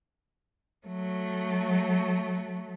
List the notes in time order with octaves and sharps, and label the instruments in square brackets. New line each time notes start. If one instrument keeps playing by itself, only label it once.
[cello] F#3 A3